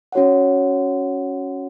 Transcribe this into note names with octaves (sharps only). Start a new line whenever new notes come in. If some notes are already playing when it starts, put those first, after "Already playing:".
C#4 F#4 C#5 F#5